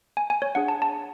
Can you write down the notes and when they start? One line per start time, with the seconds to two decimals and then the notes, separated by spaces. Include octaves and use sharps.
0.17 G#5
0.30 G#5
0.42 C#5
0.55 D4 G#4 F#5
0.68 A5
0.82 A5